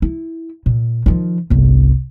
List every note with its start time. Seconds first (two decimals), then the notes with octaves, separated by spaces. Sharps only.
0.02 E4
0.66 A#2
1.06 D#3 F3
1.50 G1 C2